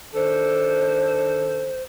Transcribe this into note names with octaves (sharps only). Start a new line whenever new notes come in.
D#3 D4 A4 C5